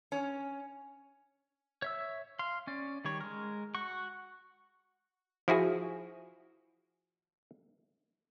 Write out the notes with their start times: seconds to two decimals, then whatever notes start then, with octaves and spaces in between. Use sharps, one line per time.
0.12 C#4
1.82 C#5 E5 E6
2.39 F5 C6
2.67 C#4 D5
3.05 D#3 G3 C#5
3.21 G#3 A#4
3.75 F#4 C#6
5.48 F3 E4 F#4 G#4